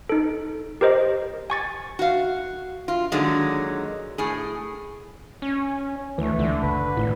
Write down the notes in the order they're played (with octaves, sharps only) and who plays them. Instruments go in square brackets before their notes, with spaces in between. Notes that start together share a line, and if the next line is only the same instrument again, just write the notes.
[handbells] D#4 A4
G4 A#4 C5 D#5
G#5 C#6 A6
[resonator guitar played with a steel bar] F#4 F5
F4
A#2 D3 D#3 F#3 G#3
A2 G#4
[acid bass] C#4
[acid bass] D2 [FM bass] E3 [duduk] A3
[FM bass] C#2 [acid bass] D3
[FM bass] F#1 [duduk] B4
[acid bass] G#1 [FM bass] A2